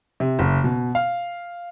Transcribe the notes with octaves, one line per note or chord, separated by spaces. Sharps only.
C3
F#1
B2
F5